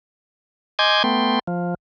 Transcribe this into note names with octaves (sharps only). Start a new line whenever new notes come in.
D#5 G#5 C6 D6 G6 G#6
A3 B3 G5 C6
F3